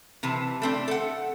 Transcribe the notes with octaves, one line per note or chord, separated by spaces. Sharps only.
C3 E3 A5
A3 C4 D4
A4 F#5